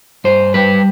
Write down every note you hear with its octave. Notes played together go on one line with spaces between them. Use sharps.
G2 C5
G3 B4